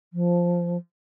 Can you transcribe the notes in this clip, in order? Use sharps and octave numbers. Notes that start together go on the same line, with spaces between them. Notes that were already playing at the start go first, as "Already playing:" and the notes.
F3